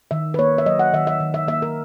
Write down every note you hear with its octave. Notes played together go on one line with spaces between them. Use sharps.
D#3 E5
B4
A#3 C#5
E5
F#3 D#5
F#5
D#3 E5
E5
D#3
E5
A#3 E5
A#4